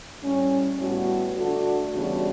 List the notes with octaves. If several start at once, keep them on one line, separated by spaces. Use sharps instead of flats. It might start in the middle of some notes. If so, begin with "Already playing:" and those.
A2 G3 C#4
A2 G3 B3 F#4
D3 A3 D4 F#4
E2 C#3 G3 D4 F#4